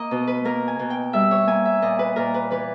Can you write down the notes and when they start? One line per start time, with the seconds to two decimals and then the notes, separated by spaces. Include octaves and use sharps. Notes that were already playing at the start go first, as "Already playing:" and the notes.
Already playing: A#3 D#5
0.11 B2
0.27 B4
0.44 A#3 A#4
0.68 G#5
0.79 B2
0.90 G5
1.13 G3 E5
1.31 C#5
1.47 A#3 G#5
1.65 E5
1.82 A#2 D#5
1.99 B4
2.16 A#2 A#4
2.34 B4
2.51 E3 B4